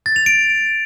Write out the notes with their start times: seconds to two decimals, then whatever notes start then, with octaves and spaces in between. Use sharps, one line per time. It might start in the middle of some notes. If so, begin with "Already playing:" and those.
0.06 A6
0.16 F7
0.26 D7